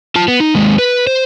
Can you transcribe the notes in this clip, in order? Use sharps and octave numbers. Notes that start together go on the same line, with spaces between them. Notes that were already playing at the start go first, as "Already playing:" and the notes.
F4 A5
B3
D#4
D#2 G#3
B4
C5